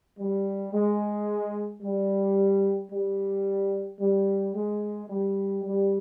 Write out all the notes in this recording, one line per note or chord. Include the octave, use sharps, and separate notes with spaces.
G3
G#3
G3
G3
G3
G#3
G3
G3